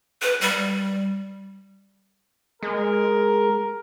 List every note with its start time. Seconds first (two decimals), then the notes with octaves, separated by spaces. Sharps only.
0.22 B4
0.41 G3
2.63 G#3 A#4